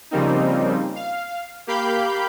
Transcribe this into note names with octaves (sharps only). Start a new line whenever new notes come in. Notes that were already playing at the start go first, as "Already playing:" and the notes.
C#3 F3 G3 A#3 C4 D#4
F5
A#3 G4 F5 B5 G6